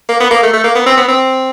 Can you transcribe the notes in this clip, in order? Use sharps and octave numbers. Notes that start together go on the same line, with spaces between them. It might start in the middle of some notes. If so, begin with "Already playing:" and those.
A#3
B3
A#3
A3
A3
A#3
B3
C4
B3
C4